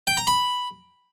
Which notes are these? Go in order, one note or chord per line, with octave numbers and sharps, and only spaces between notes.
G5
A#5
B5